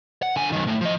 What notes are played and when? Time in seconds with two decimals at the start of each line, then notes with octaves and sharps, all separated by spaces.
0.22 F#5
0.36 D3 G#5
0.52 F#2 D#3
0.67 A2
0.81 F3 D#5